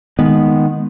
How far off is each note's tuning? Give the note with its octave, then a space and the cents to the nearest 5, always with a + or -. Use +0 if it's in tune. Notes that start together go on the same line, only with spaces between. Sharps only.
D#3 +0 G#3 +0 B3 -5